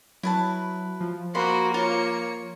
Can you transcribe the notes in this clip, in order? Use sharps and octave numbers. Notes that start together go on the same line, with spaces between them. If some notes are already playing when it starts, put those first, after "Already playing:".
F#3 E4 B4 A5
F3
A#3 F#4 B5 C6
F4 C#5 C#7